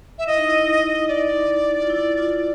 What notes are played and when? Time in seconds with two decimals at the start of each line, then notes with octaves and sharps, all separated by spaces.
0.18 E5
0.27 E4 D#5
0.38 D#4
0.49 E4
1.08 D5
1.82 F4
1.90 E4
2.18 F4